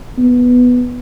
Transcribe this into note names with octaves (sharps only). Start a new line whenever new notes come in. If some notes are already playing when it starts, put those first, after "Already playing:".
B3